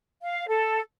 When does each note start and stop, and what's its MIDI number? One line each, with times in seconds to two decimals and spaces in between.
0.22 0.45 77
0.48 0.80 69